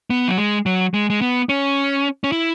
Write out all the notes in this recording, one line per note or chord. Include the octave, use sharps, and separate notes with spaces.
B3
F#3
G#3
F#3
G#3
G#3
B3
C#4
C#4
E4